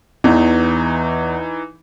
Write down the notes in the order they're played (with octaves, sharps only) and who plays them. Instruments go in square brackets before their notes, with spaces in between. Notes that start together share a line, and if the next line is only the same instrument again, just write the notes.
[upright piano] E2 [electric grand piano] E3 D#4